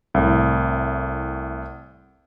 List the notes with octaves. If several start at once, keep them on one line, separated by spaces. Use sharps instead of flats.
C2 A2